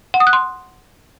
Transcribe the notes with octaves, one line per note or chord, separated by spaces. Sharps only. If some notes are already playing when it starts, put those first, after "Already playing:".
F#5
D#6
F#6
C6